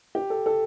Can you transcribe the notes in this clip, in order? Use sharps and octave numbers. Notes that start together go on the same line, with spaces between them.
G4
A4
A4